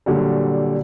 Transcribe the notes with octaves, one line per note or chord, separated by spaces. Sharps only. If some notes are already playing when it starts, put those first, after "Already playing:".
A#2 D3 F#3 G3